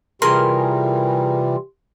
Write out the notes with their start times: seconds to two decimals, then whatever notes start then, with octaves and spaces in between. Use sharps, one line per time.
0.22 C3 E3 G3 F4 G#4 A#4 C6